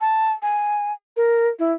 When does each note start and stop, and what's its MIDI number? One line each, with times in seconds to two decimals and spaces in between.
0.01 0.32 81
0.42 0.93 80
1.17 1.48 70
1.59 1.72 64